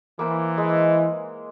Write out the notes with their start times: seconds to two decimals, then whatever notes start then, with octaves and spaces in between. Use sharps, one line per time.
0.19 E3 A#3 C5
0.58 G#3